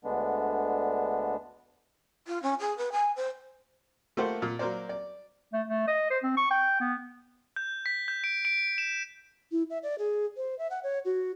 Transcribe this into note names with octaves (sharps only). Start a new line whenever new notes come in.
D2 D3 G#3 B3 D4
F4
C#4
G#4
B4
G#5
C5
A3 A#3 F4 G4 C5 F#5
A#2
F#3 A#3 A#4 C5 D5
D5
A3
A3
D#5
C5
C4
C#6
G5
B3
G6
B6
G6
D7
D7
E7
E4
E5
D5
G#4
C5
E5
F#5
C#5
F#4